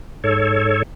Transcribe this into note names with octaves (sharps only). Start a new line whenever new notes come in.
G#2 A4 C#5